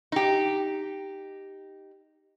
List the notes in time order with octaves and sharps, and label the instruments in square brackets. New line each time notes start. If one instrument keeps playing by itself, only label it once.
[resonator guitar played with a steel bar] D#4 G4